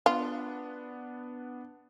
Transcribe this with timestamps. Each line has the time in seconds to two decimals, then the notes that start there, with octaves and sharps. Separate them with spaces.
0.06 B3 D4 F4